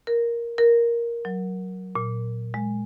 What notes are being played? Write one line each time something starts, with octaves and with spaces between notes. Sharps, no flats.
A#4
A#4
F#3
A#2
G#3